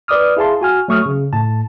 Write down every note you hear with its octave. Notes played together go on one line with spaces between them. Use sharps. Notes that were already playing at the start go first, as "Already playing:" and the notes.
B4 D5 D6 D#6 F6
E4 G#4 F5 A5 C6
F#4 G#5 F6
F#3 A3 C#6 D#6 F6
C#3
A2 A5